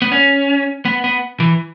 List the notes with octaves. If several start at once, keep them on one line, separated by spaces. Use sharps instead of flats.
B3
C#4
B3
B3
E3